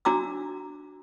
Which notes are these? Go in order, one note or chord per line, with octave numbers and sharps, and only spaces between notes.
D4 F#4 A#5 D6 E6